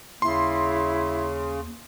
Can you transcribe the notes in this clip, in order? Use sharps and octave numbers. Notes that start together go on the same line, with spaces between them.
D#2 C#3 E4 C6